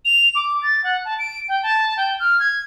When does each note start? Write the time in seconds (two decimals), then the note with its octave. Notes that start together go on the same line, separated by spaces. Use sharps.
0.05 F7
0.35 D6
0.63 A6
0.84 F#5
1.05 A5
1.19 D7
1.48 G5
1.63 A5
1.97 G5
2.20 F6
2.40 G#6